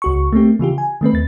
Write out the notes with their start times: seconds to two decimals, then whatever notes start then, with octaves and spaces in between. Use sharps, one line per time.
0.02 C#2 F#4 C#6
0.33 A3 A#3 C4 G4
0.59 C#3 E3 F4 G4
0.78 G#5
1.01 D#3 A3 C4 B4
1.13 D#2 A6